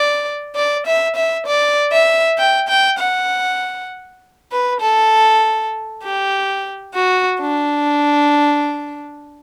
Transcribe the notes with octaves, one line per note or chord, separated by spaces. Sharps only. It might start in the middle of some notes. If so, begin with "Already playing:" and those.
Already playing: D5
D5
E5
E5
D5
E5
G5
G5
F#5
B4
A4
G4
F#4
D4